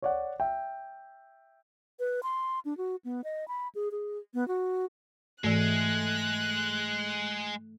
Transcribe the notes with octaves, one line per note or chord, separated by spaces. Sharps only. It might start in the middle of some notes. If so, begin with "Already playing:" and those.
C#5 D5 F#5
E5 G5
B4
C6
D4
F#4
B3
D#5
B5
G#4
G#4
B3
F#4
G#2 E3 G#3 A3 F#6